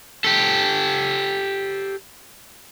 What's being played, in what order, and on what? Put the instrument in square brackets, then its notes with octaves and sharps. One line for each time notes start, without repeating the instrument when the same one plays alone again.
[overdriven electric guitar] G4 A4